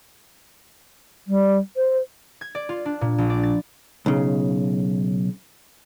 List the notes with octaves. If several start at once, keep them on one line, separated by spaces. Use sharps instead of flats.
G3
C5
G#6
D5
F4
D4
A#2
A#1
D5
A6
B1 C#3